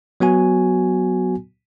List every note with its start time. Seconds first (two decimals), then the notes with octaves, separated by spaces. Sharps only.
0.20 F#3 B3 F#4 G#5